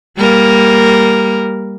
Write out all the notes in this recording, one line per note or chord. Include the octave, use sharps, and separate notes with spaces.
G3 A#3 A#4